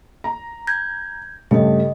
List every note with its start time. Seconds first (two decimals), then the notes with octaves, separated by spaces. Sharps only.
0.24 A#5
0.67 G6 G#6 A#6
1.51 G2 C#3 A3 G4 D#5